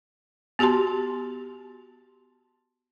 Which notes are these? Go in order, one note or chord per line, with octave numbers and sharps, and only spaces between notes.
B3 F#4 G4 A5 C6